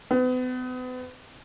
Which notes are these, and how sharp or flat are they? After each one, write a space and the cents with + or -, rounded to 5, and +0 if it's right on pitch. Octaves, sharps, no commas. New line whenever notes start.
B3 +40